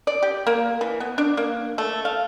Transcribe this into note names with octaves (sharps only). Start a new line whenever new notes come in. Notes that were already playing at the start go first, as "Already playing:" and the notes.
D5
G4
A#3
E3
B3
D4
A#3
A3
F5